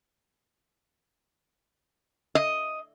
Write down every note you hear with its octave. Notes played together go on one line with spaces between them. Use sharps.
D#5